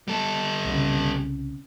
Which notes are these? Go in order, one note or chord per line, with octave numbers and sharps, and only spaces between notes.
G3 A4
C2 C#3